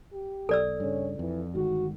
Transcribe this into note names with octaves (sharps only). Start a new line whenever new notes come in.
G4
B1 A4 D5 E6
G2 C#3 C#4
F2 E3
G1 D#3 G#3 F#4